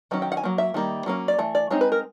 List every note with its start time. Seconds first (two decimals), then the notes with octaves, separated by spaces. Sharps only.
0.11 D#3 F#3 C#4
0.22 G5
0.32 F#5
0.37 G#5
0.43 F#3 A#3
0.58 E5
0.74 D#3 G3 A#3
1.06 F#3 A#3 C#4
1.28 D5
1.39 E3 A3
1.55 D5
1.70 G#3 C4 D#4 C#5
1.81 B4
1.92 A#4